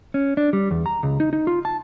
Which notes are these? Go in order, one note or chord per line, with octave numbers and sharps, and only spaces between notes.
C#4
D4
G3
E2
A#5
C#2
D#4
D#4
F4
A5